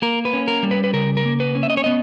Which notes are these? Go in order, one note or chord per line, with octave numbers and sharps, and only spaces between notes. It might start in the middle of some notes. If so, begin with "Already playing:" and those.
A#3 A#4
B4
C#4
A#4
G3
B4
B4
C#3 A#4
A#4
A#3
B4
C#4
E5
D#5
C#5
B3 D#5